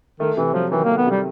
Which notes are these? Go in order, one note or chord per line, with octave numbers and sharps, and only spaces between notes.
D#3 A3
C3 E3
F3 F#3
D#3 E3
A3 A#3
B3
C3 G3